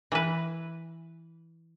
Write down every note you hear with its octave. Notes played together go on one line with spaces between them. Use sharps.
E3 B4